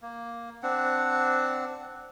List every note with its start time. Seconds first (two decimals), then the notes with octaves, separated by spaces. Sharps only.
0.02 A#3
0.63 C4 D4 F#5